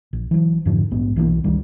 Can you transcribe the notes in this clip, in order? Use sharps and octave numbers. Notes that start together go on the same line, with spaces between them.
A#1
E3 F#3
F2 G#2 D3 F3
A#1 G#2 B3
B1 E3 G3 A#3
F#1 C#2 D#3 G3